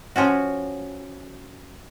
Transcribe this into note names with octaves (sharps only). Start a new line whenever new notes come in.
F3 C#4 F#4